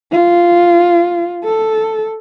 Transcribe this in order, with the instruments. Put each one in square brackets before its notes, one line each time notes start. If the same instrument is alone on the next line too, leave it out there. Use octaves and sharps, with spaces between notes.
[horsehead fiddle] F4
A4